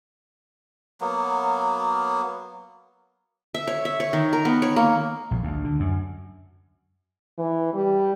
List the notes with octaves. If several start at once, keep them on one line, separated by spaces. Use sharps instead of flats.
F#3 A#3 B3
E5
C#5
E5
C#5
D#3
A#4
B3
C#5
A#3
A#1
D2
D3
F#2
E3
G3